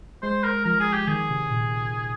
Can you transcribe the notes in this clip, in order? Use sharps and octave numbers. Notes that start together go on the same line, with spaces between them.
G#3 C5
A#4
F3 A#4
G#4
G4
D#3 G#4
C3
A#2